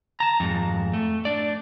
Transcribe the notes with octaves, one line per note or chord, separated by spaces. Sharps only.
A5 A#5
F2 G#2
A3
D4 D5